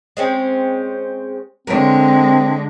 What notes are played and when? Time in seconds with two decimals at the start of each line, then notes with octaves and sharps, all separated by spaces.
0.17 G#3 C4 C#4
1.67 D3 G#3 C4 A#4 C#5